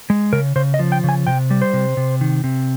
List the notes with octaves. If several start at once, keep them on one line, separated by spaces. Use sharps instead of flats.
G#3
C#3 A#4
C#3 C5
D#5
F3
G5
C#3
G#5
C3 G5
G3
C5
C3
C3
D#3
C3